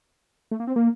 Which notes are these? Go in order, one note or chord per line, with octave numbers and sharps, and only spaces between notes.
A3
A#3
C4
A#3